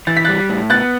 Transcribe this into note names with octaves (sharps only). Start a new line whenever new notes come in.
E3 A6
B6
G3 F#6 A6
A2
B3 F#6 A6